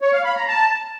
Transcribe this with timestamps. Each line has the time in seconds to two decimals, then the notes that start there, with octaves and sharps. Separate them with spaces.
0.01 C#5
0.13 F5
0.25 B5
0.36 A#5
0.48 A5